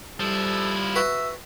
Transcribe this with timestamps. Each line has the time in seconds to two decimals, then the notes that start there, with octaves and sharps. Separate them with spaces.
0.20 F3 G3 E4 A4
0.96 F#4 B4 E5